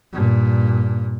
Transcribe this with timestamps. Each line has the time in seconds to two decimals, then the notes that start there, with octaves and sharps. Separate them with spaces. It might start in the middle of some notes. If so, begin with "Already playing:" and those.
0.13 G2 A#2